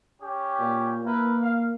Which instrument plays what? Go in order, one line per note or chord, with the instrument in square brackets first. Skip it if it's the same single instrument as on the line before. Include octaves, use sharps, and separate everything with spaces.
[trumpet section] C#4 G4
[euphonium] A#2
[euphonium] A#3 [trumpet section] E4 A#4 B4
[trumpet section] F5